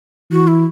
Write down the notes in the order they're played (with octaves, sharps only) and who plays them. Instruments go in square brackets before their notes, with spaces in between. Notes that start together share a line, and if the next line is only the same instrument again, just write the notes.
[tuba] E3 [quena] F#4
[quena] E4